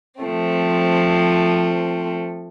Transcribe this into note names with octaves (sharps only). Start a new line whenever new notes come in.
F3 A3 C4